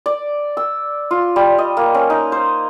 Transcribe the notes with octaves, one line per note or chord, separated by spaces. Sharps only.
D5
E6
F4
G3
D#5
A#3
C#4
D#4
C5